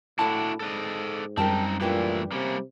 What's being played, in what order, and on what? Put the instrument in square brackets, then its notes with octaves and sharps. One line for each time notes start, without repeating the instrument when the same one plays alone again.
[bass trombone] A2 [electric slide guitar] D4 E4 F#4 [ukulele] A5 B5
[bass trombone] G#2 [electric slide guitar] A4 D5 D#5
[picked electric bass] F#2 G3 [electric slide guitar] C4 D#4 [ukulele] G4 A#4 A5
[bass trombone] A#2 [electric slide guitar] E3 A3 E4 [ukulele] D4 G4 B4
[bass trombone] C3 [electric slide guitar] G3 A#3 C#4